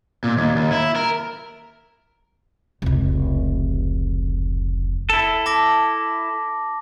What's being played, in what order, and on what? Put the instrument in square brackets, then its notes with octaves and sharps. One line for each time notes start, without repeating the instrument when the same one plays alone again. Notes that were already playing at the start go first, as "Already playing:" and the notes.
[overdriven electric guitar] A#2
D#2
D#2
E4
A#4
[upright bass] F1 C#2
[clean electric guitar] E4 A4
[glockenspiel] A5 D6 A#6